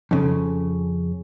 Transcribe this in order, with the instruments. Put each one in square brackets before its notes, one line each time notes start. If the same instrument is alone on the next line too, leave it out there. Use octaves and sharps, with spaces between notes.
[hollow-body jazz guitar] F2 C#3